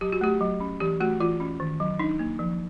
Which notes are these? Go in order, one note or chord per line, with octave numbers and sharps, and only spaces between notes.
F#3 G4
F#4
A3 G4
F#3
C#4
E3 G4
A3 F#4
E3 F4
C#4
D#3
F#3
D4 D#4
A#3
F3